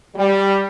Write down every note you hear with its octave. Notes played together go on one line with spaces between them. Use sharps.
G3